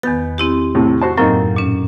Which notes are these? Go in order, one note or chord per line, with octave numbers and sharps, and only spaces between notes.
E2 D#3 B3 A6
C4 E4 G4
A2 C3
F#4 C5 A5
F#2 A2 F#3 A#3 C4 D#4
A#2 C#4